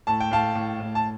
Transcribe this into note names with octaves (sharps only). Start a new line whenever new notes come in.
A2 A5
G5
A2 F5 A5
A2
A2
A5